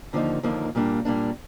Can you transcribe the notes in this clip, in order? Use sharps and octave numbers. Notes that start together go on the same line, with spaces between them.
D#2 D3 F3 A#3 D#4
D#2 D3 F3 A#3 D#4
A#2 G3 A#3 D4
A#2 G3 A#3 D4